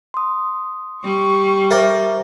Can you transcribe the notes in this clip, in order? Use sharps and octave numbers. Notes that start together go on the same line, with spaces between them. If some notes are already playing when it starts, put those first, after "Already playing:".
C6 D#6
G3 C#6
A#4 C5 D5 E5 G5